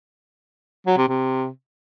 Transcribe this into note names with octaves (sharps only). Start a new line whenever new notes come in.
F#3
C3
C3